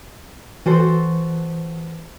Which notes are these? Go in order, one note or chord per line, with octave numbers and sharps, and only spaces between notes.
E3 F#4 A4 C5